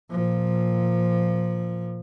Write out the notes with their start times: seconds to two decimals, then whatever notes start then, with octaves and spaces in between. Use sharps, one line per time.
0.10 A#2 F3